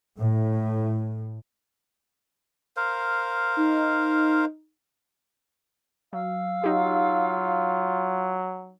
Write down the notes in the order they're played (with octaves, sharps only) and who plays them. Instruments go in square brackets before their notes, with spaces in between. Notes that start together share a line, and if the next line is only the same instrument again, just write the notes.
[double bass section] A2
[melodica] A#4 C5 F5
[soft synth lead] D#4
[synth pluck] F#3 [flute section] F5 E6
[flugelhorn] F#3 [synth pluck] D#4 G4 [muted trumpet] F4